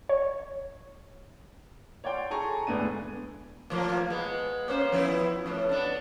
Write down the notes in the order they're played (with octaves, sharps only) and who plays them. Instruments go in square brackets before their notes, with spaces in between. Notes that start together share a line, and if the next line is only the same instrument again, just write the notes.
[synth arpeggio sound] C#5
[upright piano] C#5 D5 F#5 G5 C6
G#4 A4 G#5 A#5 C#6
D2 A2 G#3 B3 D4 D#7
[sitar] A2 F3 A#3
G#3 B3
A#3 C#4 C5
F3 B3 E4
F2 A2
B3 D4